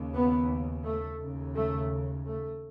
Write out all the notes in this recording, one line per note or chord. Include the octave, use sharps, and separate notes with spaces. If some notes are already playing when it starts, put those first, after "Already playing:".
Already playing: D#2 C#3
B3
A3
D#2 C#3
A3
A3